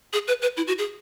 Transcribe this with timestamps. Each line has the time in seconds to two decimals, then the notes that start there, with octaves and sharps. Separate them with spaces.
0.13 G#4
0.28 B4
0.42 B4
0.57 E4
0.67 F#4
0.78 G#4